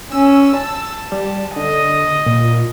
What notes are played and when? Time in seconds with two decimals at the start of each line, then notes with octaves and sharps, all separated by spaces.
0.12 C#4 E6
0.58 A5
1.12 G3
1.56 D3 D#5
2.26 A#2